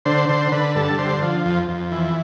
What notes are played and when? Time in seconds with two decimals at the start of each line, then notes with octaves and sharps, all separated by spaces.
0.05 D3 C5
0.29 D3 C5
0.52 D3 B4
0.75 G2 A4
0.98 D3 C5
1.22 F3
1.46 F2
1.68 F2
1.91 E3